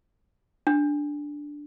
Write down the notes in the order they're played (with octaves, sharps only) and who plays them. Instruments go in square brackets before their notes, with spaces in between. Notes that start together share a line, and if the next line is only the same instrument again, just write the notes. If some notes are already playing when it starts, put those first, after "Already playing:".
[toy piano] D4